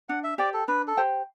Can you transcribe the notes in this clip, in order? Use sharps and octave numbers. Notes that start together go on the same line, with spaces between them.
D4 F#5
E5
G4 C5 D5 G5
A4
D4 B4
A4
G4 C5 G5